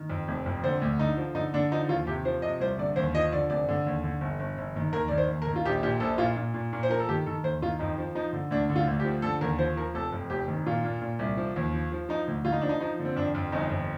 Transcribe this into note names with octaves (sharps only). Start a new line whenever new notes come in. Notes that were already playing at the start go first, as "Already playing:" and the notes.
Already playing: D#3
F2
F1
F2
D3 C5
D2
D3 D#4
F3
D3 D#4
D3 D4
F3 D#4
D#2 F4
C3 G4
F3 C5
C3 D#5
C2 C5
D3 D5
D#2 C5
F3 D#5
D3 D5
F1 D5
D3
D#2
D3
G1
G1
G1
D#3
D#2 A#4
D#3 D5
C5
D#2
A#4
D#3
F4
A#1 G4
A#2 G4
A#1 A4
A#2 F4
A#2
A#2
A#2
C5
F3 A#4
A4
D#3 G4
D#3 A4
D#2 C5
D#3 F4
F2 D#4
F3
F3 D#4
D3
D2 D4
D3
F4
D2
G4
F3
D3 A4
D#2 A#4
F3 C5
F3 A#4
F1 A4
F2
F1 G4
D#3
A#2 F4
A#2
A#2
C2
F3
D#2
F3
F3
F3 D#4
D2
D2 F4
D#4
F3 D4
D#4
F3 D#4
D3
C4
F2 D4
F2
G1 D#4
F2